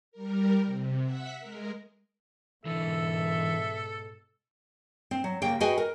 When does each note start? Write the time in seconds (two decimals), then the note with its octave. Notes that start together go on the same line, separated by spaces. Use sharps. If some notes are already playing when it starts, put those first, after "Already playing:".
0.12 G3 A#4
0.66 C3
1.02 E5 F#5 B6
1.39 G#3 A#4
2.65 G#2 B2 D3 E3 A4 E5
5.11 C4
5.24 F#3
5.42 C#3 A#3 G4 G5
5.60 F#4 G#4 B4 D#5 G5 G#5
5.78 A#4